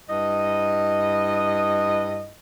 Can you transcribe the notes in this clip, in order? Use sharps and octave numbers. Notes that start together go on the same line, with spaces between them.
G2 E4 D#5